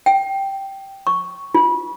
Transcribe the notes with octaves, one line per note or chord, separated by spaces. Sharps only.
G5
C#6
F4